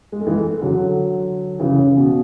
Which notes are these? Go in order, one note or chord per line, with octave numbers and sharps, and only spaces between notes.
G#3
A3
E3 G#3
D3 F#3
C#3 E3
C#3
B2